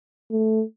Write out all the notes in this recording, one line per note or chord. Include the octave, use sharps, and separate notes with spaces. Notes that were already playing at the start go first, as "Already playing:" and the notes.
A3